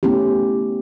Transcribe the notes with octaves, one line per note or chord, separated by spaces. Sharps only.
A3 B3 C#4 E4 G4